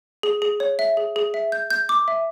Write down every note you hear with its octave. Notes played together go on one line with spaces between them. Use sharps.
G#4
G#4
C#5
E5
G#4
G#4
E5
G6
G6
D6
E5